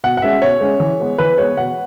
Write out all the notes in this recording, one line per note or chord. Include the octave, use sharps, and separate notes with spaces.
B2 F#5
F#5
G#3 C#4 E5
B2 C#5
G#3 C#4
E3
G#3 B3
E3 B4
G#3 B3 C#5
B2 F#5